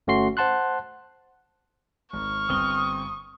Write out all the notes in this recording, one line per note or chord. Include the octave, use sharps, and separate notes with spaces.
G1 A3 C#4 F#4 C6 C7
C5 F#5 A5 C6 F#6
G#1 C#6 F6
G1 C4 D#6 G7